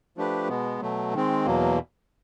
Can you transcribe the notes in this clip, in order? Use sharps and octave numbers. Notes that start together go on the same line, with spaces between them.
F3 A3 D4 G4 B4
B2 G#3 B3
B2 F#3 A3
D#3 G#3 C4
E2 B2 F#3 A#3